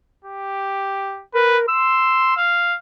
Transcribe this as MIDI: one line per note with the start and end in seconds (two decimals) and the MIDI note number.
0.25 1.22 67
1.34 1.66 70
1.34 1.58 71
1.68 2.33 84
1.68 2.39 88
2.37 2.76 77